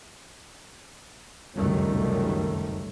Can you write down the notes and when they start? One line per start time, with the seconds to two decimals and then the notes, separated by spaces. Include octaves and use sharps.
1.56 F1 C#2 F#2 D#3 G3 A3